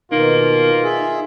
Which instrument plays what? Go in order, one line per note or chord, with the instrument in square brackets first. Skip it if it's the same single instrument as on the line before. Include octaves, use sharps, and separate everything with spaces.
[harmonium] B2 D#3 [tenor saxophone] A#3 [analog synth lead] D#4 [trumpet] F4
[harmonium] G#4 E5